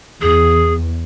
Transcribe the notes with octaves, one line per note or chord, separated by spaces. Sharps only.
E2 G#4